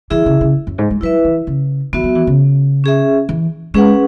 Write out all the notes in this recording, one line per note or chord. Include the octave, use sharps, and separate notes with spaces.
E3 E4 G#4 E5
C#3
C#3
F#2
G#2
G#3
F#3 E4 B4 E5
E3
C#3
E3 B3 F#4 E5
F#3
E3
C#3
C#4 G#4 E5
E3
G#3 C#4 G#4 B4 F#5